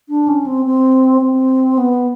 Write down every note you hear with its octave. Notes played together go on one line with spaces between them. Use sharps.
D4
C#4
C4
C4
C4
B3